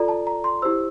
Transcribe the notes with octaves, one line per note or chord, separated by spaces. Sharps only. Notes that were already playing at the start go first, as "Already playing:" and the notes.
Already playing: F4 A4 D5 A#5
A5
A#5
C6
E4 G4 C5 E6